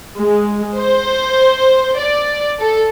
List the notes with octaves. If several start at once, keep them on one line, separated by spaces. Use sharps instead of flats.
G#3
C5
D5
A4